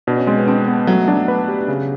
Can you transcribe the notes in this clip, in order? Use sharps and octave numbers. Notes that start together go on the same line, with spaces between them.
B2 D4
C#4
G#3 C4
B3
C4 D4
B3
F#3 A3
F#3 D4
B4
G4
C#3